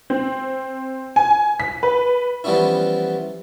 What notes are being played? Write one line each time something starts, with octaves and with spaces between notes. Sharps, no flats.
C4
G#5
B6
B4
E3 F3 G3 B3 C#4 E4